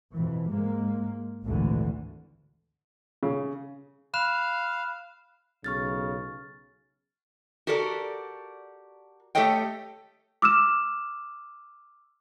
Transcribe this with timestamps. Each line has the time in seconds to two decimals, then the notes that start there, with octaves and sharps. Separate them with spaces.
0.13 F2 B2 E3
0.50 G#2 G#3 A#3
1.45 G#1 D2 A#2 D3 E3
3.23 C#3
4.14 F5 B5 F#6 E7
5.64 B1 C#3 C#6 F6 A6
7.67 F#4 G4 A4 A#4 D5
9.35 A3 G4 A4 C#5 D#5 G5
10.42 D6 E6 F6 E7